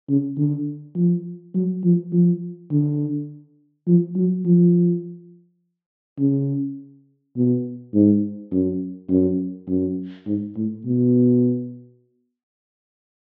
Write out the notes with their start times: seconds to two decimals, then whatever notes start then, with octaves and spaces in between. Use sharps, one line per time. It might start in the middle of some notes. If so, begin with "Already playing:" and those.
0.10 C#3
0.38 D3
0.96 F3
1.55 F#3
1.84 F3
2.13 F3
2.71 D3
3.87 F3
4.17 F#3
4.46 F3
6.19 C#3
7.37 B2
7.94 G#2
8.52 F#2
9.10 F#2
9.69 F#2
10.27 G#2
10.57 A2
10.86 B2